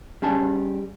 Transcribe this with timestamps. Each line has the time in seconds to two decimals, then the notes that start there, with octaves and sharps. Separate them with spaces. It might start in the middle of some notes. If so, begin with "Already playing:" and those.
0.22 G3 C#4 G#4 A5